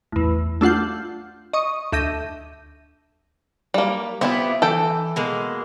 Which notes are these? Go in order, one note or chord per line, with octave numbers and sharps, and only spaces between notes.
A1 E2
A3 D4 F4 F#5 G6
D#5 C#6 D#6
D2 E5 G6 A#6 D#7
G3 A#3
B3 C4 E4 F4 G4
E3 A4 G5
B2 G#3 A#3